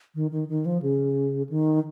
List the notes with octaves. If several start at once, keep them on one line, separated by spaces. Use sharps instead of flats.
D#3
D#3
D#3
F3
C#3
D#3